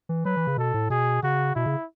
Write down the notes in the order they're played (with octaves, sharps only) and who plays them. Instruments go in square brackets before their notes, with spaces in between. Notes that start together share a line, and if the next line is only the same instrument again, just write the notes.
[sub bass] E3
[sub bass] F#3 [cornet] B4
[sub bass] E3
C#3
[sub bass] B2 [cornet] A4
[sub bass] A2
[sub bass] B2 [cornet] G#4
[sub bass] C#3 [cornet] F#4
[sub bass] B2 [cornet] E4
[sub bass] C#3